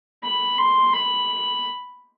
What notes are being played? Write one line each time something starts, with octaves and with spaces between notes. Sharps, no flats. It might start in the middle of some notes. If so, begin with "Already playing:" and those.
B5
C6
B5